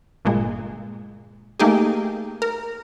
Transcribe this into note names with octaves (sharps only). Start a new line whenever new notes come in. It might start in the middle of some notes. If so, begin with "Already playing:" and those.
G1 A#2 G#3
A3 A#3 D#4 G4 G#4
A#4